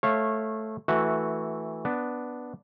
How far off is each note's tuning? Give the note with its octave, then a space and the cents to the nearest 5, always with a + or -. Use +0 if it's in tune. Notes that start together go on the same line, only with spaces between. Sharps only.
A3 -5 C#5 -25 F5 +0
E3 -15 A3 +0 F#4 -5
B3 +0 D4 +0